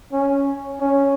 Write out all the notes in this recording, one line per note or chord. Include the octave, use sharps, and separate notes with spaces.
C#4
C#4